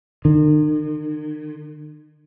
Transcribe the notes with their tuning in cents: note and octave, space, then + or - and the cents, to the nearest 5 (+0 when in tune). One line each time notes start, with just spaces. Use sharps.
D#3 -45